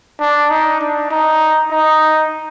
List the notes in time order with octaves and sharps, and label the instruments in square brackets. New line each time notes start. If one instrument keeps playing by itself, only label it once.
[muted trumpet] D4
D#4
D4
D#4
D#4